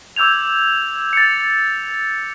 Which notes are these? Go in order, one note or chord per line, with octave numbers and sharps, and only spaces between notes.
D6 E6 G6 G#6 F7
A6 C#7